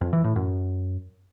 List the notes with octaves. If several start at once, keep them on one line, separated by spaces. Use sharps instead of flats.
F2
E3
A2
F#2